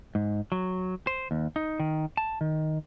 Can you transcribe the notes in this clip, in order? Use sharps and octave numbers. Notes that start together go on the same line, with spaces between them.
G#2
F#3
C5
D#2
D#4
D#3
A5
D#3